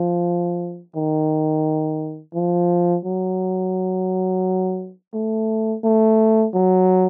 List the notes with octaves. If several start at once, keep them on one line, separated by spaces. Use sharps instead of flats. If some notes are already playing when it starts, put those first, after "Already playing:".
Already playing: F3
D#3
F3
F#3
A3
A3
F#3